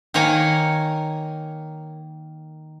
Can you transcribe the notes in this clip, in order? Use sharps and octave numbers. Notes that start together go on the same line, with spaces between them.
D#3 A#3 A#4 C#5 G#5 A#5